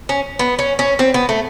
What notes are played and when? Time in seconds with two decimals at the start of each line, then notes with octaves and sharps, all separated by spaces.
0.09 C#4
0.39 B3
0.59 C#4
0.79 C#4
0.99 C4
1.14 B3
1.29 A3